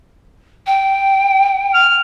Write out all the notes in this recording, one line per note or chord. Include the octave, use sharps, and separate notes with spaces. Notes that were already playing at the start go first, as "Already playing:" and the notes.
G5
F6